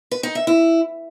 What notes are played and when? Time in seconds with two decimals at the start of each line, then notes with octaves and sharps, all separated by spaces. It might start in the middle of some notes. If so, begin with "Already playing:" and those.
0.11 B4
0.23 D#4
0.35 E5
0.47 E4